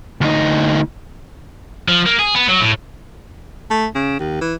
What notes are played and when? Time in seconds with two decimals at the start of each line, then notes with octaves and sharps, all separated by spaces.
0.21 D2 D#4
1.88 F3
2.06 A#3
2.19 G#4
2.35 B3
2.48 F#3
2.60 A2
3.71 A3
3.95 C#3
4.20 D#2
4.41 E3